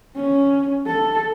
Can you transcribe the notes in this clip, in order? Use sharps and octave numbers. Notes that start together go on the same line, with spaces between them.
C#4
A4